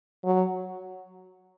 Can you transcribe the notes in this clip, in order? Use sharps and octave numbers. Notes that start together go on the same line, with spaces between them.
F#3